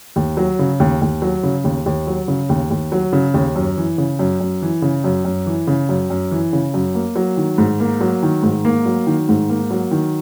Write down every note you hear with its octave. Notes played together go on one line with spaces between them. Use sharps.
D#2
F#3
C#3
D#2
D#2
F#3
C#3
D#2
D#2
F#3
C#3
D#2
D#2
F#3
C#3
D#2
F#2
E3
C#3
F#2
F#2
E3
C#3
F#2
F#2
E3
C#3
F#2
F#2
E3
C#3
F#2
A#3
F#3
D#3
G#2
A#3
F#3
D#3
G#2
A#3
F#3
D#3
G#2
A#3
F#3
D#3